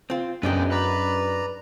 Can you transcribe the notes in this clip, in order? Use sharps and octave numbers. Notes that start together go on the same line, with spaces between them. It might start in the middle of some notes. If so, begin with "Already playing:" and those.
C4 F4
F#2 B3 D4 D#4 G#4 G5
B4 D5 A#5